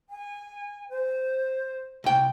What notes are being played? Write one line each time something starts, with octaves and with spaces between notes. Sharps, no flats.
G#5
C5
C2 G5